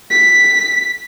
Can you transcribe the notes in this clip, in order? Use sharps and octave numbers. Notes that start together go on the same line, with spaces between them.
B6